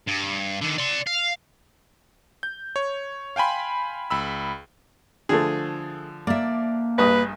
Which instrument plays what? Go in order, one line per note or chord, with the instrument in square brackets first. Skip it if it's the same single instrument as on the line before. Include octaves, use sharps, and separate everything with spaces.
[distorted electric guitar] G2
D3 D#3
D5 C6
F5
[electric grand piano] G6
C#5
F5 G5 G#5 B5 C6
C#2 B5 E6
[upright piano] D3 F3 [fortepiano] A3 G#4
[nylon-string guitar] A#3 E5 [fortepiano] D5
[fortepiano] A#1 G2 D#6 [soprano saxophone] B4